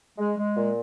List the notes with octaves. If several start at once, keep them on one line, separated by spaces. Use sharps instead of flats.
G#3
G#3
A#2